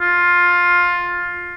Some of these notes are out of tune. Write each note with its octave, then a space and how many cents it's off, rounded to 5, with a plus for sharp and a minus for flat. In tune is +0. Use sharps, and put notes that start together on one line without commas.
F4 +15